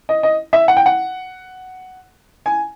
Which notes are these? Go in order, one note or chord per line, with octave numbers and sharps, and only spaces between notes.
D#5
D#5
E5
F#5
G5
F#5
G#5